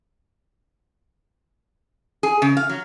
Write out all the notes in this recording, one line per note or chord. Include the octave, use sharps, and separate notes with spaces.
G#4
C#3
F5
F#3